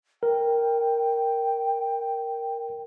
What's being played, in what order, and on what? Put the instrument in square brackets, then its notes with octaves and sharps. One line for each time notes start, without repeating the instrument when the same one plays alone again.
[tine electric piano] A#4 [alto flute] G5